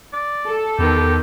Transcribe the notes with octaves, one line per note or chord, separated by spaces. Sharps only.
D5
A4
E2 D#3 B3 G4